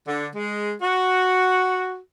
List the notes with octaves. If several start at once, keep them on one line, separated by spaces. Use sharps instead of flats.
D3
G#3
F#4